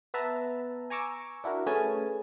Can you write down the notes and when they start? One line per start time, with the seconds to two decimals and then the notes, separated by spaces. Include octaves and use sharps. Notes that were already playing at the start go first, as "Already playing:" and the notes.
0.14 B3 B4 E5 A5 A#5
0.90 G#5 A#5 C#6 D6 E6
1.44 D4 E4 F#4 A#4
1.66 A3 C#4 G#4 B4 G#5 A5